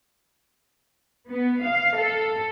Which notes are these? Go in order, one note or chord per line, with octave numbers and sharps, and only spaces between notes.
B3
F5
A4